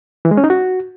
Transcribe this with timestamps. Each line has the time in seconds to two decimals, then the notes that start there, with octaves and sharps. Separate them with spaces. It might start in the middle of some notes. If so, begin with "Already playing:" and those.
0.25 E3
0.31 G#3
0.37 C#4
0.44 D#4
0.50 F#4